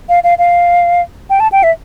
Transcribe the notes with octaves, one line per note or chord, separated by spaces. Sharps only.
F5
F5
F5
G5
A5
G5
E5